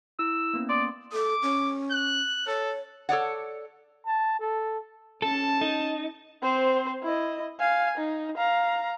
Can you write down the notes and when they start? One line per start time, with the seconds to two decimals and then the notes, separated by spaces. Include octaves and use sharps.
0.19 E4 E6
0.54 A#3 B3 C#4
0.69 D5 C6 D#6
1.13 A4 D6
1.42 C#4
1.91 F#6
2.47 A4 C#5
3.09 A4 C#5 D5 F#5
4.06 A5
4.40 A4
5.22 C#4 A4 A5
5.61 D#4
6.42 C4 C5
7.03 E4 D#5
7.60 F5 G#5
7.97 D#4
8.37 F5 A#5